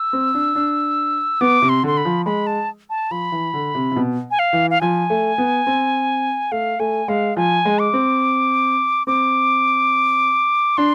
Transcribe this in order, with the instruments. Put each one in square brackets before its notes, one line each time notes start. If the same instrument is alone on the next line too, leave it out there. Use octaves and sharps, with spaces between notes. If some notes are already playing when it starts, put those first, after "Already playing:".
Already playing: [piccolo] E6
[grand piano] C4
D4
D4
[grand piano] B3 [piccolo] D6
[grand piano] C3
[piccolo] C6
[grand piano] D3 [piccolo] C6
[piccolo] B5
[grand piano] F3
[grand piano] G#3 [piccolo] B5
[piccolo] A5
A5
[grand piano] F3 [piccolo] B5
[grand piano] E3
D3
C3
C3
B2
[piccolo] G#5
F5
[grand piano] E3
[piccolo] F5
[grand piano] F3 [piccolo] G#5
[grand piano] A3
B3
C4
[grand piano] A3 [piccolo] F5
[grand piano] A3 [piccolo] G#5
[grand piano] G#3 [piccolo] F5
[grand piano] F3 [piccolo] G#5
[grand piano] G#3
[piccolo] D6
[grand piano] C4
[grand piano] C4 [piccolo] D6
[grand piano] D4 [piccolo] C6